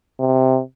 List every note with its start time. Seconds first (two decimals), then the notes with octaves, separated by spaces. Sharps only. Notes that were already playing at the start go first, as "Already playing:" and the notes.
0.20 C3